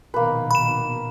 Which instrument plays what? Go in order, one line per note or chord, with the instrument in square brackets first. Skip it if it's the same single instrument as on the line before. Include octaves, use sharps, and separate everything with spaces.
[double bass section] A#1 B2 D#3 [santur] A#3 B4
[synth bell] B5 E7